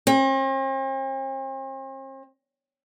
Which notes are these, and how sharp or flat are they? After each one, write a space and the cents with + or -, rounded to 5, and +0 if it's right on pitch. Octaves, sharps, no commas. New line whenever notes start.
C4 +45